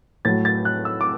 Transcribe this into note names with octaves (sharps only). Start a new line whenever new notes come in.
A2 F#3 A6
A6
F#6
E6
D6